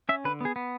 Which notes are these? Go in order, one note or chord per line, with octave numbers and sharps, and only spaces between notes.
C#4 E5
D3 B4
B3 G#4
B3